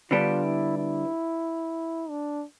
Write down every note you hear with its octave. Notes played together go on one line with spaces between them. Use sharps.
D3 G3 B3 D4 F4 G4
E4
E4
D4